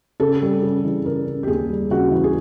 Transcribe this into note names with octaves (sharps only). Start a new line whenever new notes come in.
C#3 A4
G3
C#3
E3
C#3 A#4
C#3
G4
D#2 G#4
G3
C#3 F#4
E3
G#4